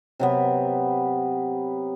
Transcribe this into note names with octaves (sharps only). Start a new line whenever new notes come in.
C3 F#3 B3